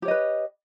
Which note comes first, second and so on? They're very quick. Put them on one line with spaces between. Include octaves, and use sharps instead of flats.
G4 C#5 D#5 B4